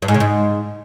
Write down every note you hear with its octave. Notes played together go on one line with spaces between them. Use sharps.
G2
G#2
C#3
G#2